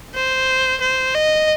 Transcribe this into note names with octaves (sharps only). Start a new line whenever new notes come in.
C5
C5
D#5